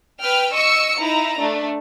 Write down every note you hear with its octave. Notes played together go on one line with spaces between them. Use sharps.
B4 G5 F6
D#5 C#6 E6 C#7
D#4 E4 A#5
A3 D4